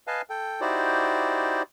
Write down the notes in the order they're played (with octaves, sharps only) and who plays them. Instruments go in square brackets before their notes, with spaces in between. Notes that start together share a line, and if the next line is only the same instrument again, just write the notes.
[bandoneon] B4 D#5 F5 G#5 A5
A4 G5
D#4 E4 F#4 G4 C5 D5